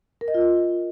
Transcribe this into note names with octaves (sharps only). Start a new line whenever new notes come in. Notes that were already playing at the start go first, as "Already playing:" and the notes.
A#4
D#5
F4
D#5